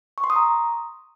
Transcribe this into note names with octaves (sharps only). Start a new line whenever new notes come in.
C#6
C6
D#6
A#5